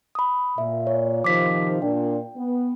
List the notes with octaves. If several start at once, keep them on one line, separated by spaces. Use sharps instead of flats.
B5 D#6
A#2 E5
C#5
C3 D#3 F3 D6 B6
A#2 D4 G5
B3